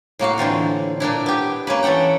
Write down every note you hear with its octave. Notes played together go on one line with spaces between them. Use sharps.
A2 A#3 F#4 F5
D3 E3 C4 F4
A#2 A#3 D4 E4
B3 G4
A#3 C#4 B4
E3 C#4 A4 F#5 G5